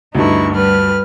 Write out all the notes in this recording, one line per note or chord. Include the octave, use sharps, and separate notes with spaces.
D2 G2 D#4 E4 C#6
G3 B4 F6